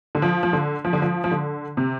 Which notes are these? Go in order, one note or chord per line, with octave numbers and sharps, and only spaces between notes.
D3
F3
F3
D3
F3
D3
F3
F3
D3
C3